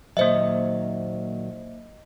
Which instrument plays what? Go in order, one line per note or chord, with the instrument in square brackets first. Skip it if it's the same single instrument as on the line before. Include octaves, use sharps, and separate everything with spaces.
[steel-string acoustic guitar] A#2 D#3 F#3 [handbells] A#3 C5 E5 [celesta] D#5